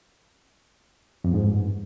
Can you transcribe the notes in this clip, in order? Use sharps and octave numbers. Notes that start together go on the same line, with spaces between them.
F2
G#2
G2